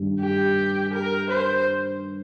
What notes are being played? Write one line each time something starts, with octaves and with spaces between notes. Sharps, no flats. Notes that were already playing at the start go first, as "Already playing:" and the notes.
Already playing: G2 D#3 G3
G4
A#4
C5